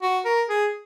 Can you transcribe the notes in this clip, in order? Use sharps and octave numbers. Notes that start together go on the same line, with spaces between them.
F#4
A#4
G#4